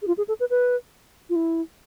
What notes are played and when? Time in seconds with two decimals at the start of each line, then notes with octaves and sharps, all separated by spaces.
0.02 G#4
0.07 F4
0.17 G#4
0.28 A4
0.40 B4
0.50 B4
1.29 F4
1.36 E4